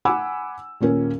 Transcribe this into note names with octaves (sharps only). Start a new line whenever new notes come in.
F#5 G#5 B5 D6 E6
D#1 A#2 C#4 A#4